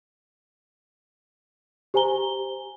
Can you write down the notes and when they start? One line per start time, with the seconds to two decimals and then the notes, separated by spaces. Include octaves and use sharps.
1.94 G4 C5 G#5 A#5 G7